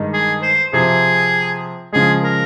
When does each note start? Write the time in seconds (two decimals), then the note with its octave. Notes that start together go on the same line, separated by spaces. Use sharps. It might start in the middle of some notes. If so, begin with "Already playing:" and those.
Already playing: G2 D#3 G#3 D#4
0.13 G#4
0.43 C5
0.73 C3 F3 C4 G#4
1.93 C#3 F3 G#3 G#4
2.23 A#4